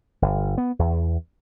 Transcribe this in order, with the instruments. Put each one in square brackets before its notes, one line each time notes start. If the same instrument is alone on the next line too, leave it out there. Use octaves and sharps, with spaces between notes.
[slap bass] G1
B3
E2